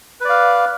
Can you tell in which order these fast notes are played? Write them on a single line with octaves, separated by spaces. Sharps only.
B4 D5 F5